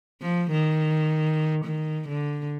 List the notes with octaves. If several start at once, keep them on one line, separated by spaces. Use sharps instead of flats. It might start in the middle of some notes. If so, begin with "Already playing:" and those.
F3
D#3
D#3
D3